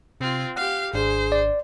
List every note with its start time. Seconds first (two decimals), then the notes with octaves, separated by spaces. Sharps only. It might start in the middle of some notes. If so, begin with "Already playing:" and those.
0.20 C3 C4 F4
0.56 G4 F5 F#5
0.94 G#1 D4 G#4 C5
1.32 D5